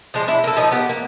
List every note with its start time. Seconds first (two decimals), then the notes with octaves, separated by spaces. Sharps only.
0.14 F3 G#3 D4
0.28 D4 E4
0.44 A#3 A4
0.57 F3 D#4 A#4 C#5
0.71 B3 G4
0.89 A#3